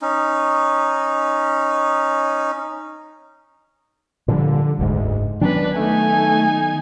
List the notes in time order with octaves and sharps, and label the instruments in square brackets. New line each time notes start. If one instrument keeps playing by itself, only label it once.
[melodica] C#4 D#4
[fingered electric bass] A#2 F3 G3 [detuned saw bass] D3
[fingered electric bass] F#1 G#2 [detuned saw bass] D2
[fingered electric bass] D#3 F#3 B3 [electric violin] C#4 B4 [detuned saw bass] D4
[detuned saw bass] A3 [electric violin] D#4 G#5